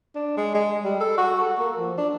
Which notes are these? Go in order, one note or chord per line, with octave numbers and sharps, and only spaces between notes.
D4
G#3
G#3
G3
A4
F#4
A4
A#3
F3
D4